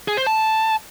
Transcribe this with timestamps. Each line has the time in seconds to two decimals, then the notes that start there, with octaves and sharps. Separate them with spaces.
0.08 G#4
0.17 C5
0.27 A5